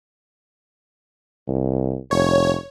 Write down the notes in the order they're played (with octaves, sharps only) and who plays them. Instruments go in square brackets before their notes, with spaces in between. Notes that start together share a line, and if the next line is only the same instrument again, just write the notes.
[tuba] C2
[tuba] F1 [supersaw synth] C#5